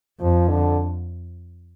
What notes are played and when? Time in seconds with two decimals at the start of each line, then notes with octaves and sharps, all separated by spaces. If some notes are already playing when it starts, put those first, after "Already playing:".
0.20 F2 F3
0.48 D3